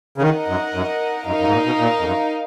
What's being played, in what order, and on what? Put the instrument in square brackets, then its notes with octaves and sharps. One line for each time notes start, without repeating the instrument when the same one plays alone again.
[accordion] C#3
[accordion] D#3 [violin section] D#4 A#4 D#5 F#5
[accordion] F#2
F#2
[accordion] F#2 [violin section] D#4 A#4 F5
[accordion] F#2
G#2
A#2
B2
A#2
F2
F#2